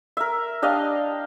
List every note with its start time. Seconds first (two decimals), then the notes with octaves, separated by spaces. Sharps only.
0.17 A#4 E5
0.62 D4 G4 D#5 F5